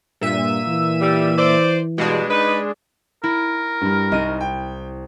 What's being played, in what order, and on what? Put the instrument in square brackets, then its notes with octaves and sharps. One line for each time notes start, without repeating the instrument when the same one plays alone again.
[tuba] G2 [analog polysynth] A#2 E5 D#7
[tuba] E3
[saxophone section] G3
C5 D5
[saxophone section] G2 B2 [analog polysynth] G#3 D4
[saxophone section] D#4 B4
[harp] E4 [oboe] A#4
[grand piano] G2 G3
[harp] C2 D#7 [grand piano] D#4
[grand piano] G5